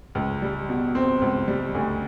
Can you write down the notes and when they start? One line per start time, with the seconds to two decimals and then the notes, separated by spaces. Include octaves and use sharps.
0.15 C#2
0.42 G3
0.69 B2
0.95 C4
1.22 C#2
1.48 G3
1.75 D2